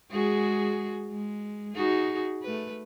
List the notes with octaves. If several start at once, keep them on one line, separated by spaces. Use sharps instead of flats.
G#3 F#4 G#4
G#3
D#4 F#4 G#4
A3 B4